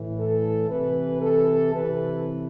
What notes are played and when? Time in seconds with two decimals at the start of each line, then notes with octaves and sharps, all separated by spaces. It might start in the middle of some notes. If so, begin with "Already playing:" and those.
Already playing: A2 E3
0.18 A4
0.69 C3 E3 B4
1.21 A4
1.72 C3 E3 B4